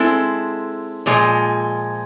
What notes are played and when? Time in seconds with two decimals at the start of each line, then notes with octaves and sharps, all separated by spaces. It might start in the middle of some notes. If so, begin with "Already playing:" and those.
Already playing: G#3 C4 E4 A4
1.06 A#2 F3 G#3